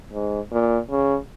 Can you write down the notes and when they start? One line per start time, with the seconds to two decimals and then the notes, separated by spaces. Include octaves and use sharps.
0.13 G#2
0.52 A#2
0.90 C#3